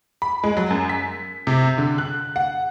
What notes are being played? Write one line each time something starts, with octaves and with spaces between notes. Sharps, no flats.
B5
G#3
F#3
F#2
B6
C3
D3
F#6
F#5